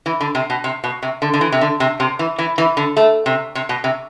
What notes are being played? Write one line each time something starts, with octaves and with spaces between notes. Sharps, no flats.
E3
D3
C3
B2
C3
B2
C3
D3
D3
E3
C3
D3
C3
C3
E3
E3
E3
D3
A3
C3
C3
B2
C3